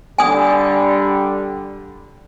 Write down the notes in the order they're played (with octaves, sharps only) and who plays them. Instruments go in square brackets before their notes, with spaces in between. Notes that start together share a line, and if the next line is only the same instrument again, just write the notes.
[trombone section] D3 G3 [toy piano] G#5 D#6